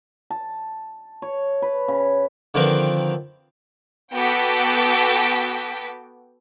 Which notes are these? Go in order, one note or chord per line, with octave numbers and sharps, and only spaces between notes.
A5
C#5
B4
C#3
D3 D#3 F3 C4 A#4 B4
B3 F#4 A4 G5 D6 B6